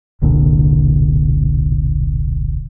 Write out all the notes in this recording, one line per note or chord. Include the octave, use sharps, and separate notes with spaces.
E1 C2 A#2 D3